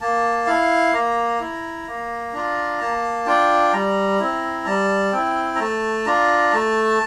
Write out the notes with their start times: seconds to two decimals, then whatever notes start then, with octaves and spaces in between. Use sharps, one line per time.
0.01 A#3 A5
0.47 E4 F5
0.93 A#3 A#5
1.40 E4
1.87 A#3
2.33 D4 F4
2.80 A#3 A5
3.26 D4 F4 G5
3.73 G3 A#5
4.20 C4 E4
4.66 G3 A5
5.13 C4 E4 G5
5.55 A#5
5.59 A3 A5
6.06 D4 F4 A#5
6.52 A3 A5